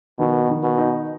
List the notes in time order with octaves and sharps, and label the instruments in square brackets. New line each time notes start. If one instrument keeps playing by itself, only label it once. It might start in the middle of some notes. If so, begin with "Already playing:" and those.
[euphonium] B2 [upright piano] D#3
[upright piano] D#3
[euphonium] B2
[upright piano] D#4